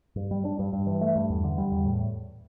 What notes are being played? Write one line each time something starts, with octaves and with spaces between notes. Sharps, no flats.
G2
G3
D4
G2
G2
E3
A3
G2
E2
D3
G3
E2
A2